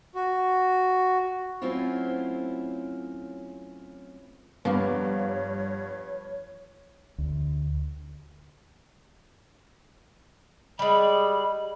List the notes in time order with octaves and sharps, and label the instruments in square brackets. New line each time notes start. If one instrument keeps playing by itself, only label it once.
[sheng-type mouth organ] F#4
[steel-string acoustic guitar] F#3 A3 C4 C#4 E4 F4
[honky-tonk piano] G2 [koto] F3 A#3 [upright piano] B3 [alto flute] C#5
[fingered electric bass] D2
[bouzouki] G3 G#3 [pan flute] B5